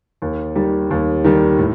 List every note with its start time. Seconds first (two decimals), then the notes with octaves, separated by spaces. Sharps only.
0.22 D#2
0.56 D#3 G3
0.91 D#2
1.24 D#3 G3
1.58 A2